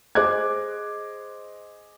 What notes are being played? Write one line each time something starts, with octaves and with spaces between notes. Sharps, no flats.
G#4 C5 D#5 D6 F#6 G#6